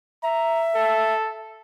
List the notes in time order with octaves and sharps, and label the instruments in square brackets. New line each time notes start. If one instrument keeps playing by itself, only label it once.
[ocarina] E5 [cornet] A#5
[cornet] A4